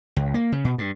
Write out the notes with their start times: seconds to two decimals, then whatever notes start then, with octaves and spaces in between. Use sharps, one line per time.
0.16 C#2
0.34 A#3
0.52 C#3
0.65 B2
0.78 G2